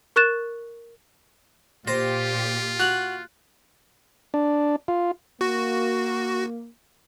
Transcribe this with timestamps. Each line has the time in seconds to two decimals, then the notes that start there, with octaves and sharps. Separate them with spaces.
0.16 A#4 C#6 F#6 A6 E7
1.88 A#2 F4 G4 C5 A#6
2.80 F#4 F#6 F7 F#7
4.34 D4
4.88 F4
5.41 A#3 F#4